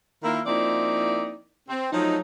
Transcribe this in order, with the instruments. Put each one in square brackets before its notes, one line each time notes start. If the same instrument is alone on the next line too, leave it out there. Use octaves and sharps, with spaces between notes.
[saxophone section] D#3 A#3 E4 F4 E5
F3 A#3 C4 D#4 E4 D5
C4
F3 F#3 A3 D#4